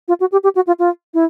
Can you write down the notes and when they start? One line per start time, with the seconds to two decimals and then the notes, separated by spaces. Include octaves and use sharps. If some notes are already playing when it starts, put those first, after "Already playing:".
0.08 F4
0.20 F#4
0.32 G4
0.44 G4
0.55 F#4
0.67 F4
0.79 F4
1.14 E4